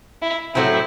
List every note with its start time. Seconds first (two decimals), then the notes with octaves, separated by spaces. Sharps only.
0.22 E4
0.54 A2 F#3 C4 E4